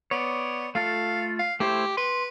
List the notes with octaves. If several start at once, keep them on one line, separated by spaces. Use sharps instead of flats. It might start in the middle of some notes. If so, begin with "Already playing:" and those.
B3 C#5 D5
A3 F4 A4 F5
F5
A3 E4 G4 C5
B4 C6